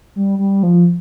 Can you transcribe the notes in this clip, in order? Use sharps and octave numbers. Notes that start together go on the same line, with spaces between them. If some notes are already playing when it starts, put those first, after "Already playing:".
G3
G3
F3